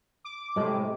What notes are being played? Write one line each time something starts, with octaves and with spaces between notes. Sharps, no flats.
D6
A2 C3 G#3